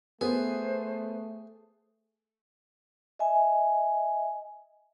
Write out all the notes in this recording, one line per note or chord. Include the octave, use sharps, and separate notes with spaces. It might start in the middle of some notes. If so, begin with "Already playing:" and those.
A3 B3 G#4 C5
D#5 E5 G#5